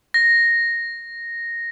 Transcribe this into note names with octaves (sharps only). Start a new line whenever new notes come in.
A#6